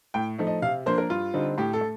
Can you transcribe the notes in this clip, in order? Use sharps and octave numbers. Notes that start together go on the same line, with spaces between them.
A2 G5
F3 A3 D#4
D#5
C3 F5
F3 A#3 D4 C5
A#4
G2 F4
D3 G3 C4 D#4
A2 G4
A4
A3